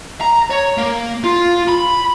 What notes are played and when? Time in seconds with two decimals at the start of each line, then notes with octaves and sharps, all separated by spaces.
0.21 A#5
0.50 C#5
0.78 A#3
1.24 F4
1.68 B5